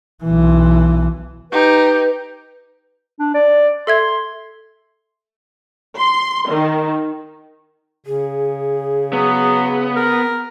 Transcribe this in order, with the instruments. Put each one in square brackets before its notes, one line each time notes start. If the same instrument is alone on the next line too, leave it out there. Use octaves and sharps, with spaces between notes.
[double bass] B1 E3
[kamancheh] D#4 G4 [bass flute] B4
[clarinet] D4
D5
[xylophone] A4 E5 G#6 [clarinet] C6
[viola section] C6
D#3
[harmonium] C#3 [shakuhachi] G#4
[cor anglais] F#3 [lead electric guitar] B3
[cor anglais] A#4